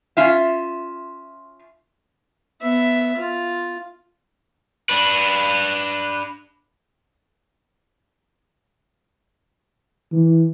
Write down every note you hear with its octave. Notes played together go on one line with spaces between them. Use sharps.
C#4 F4 E5
B3 E5
F4
D4 B4
E3